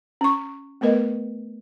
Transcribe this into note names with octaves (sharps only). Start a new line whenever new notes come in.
C#4 C#6
A3 B3 A#4 B4 D#5